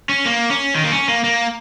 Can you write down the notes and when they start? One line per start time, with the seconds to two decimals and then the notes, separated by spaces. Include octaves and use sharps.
0.09 C#4
0.26 A#3
0.51 C#4
0.75 D#3
0.84 A#3
0.92 C#4
1.08 A#3
1.24 A#3